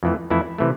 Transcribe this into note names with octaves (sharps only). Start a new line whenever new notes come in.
F2 E3 A3
F2 E3 A3 E4
C3 E3 A3